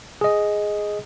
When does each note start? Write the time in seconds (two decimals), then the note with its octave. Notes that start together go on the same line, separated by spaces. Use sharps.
0.21 G#4 D#5